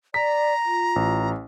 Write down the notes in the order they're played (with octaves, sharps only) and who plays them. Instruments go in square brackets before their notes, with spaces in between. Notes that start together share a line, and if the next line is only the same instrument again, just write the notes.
[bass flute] D5 [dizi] A#5 [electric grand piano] B6
[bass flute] F4
[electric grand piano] A1